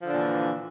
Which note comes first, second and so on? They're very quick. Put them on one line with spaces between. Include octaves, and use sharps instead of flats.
F3 D3 D4 A#2 E3